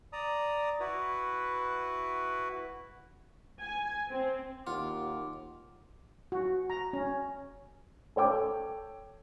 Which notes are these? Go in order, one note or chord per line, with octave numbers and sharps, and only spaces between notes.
D5 A#5 D#6
E4 F#4 B4
G#5
C4
D#2 F4 F#5 D6
F#4
A#5
C#4
A4 C#5 G5 D6